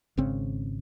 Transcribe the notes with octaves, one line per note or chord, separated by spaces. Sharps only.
G#1 C#3 C4